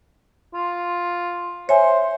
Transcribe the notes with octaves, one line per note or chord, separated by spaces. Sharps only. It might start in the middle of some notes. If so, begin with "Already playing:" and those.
F4
C5 C#5 E5 G#5